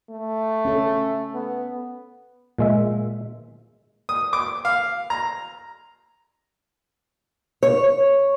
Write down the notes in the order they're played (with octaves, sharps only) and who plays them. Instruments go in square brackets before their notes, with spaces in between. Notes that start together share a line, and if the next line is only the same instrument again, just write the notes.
[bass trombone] A3
[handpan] C#4 A4
[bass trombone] B3
[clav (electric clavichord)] A#2 G#3 E5
[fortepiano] D#6
D6
F5
A#5
[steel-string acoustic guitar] C#5